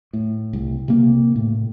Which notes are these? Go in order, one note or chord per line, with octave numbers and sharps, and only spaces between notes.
A2
C2
C3 A#3
A2